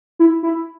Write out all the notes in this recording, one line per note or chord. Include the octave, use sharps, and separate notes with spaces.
E4
E4